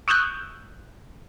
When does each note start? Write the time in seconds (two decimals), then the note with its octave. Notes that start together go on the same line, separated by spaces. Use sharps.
0.08 C#6 D#6 E6 F#6 G6